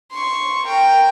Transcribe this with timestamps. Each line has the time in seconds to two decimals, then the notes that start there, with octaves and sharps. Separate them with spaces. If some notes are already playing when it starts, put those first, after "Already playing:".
0.11 C6 C#6
0.65 A#4 G5